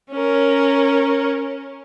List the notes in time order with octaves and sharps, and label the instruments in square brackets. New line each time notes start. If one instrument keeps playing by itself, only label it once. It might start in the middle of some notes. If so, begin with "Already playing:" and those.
[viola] C#4 A#4